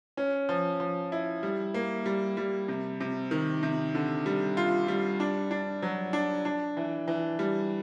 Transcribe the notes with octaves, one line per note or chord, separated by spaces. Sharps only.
C#4
F3
F3
E4
G3
A#3
G3
G3
C3
C3
D#3
C3
D3
G3
F4
G3
D4
D4
F#3
D4
D4
E3
E3
G3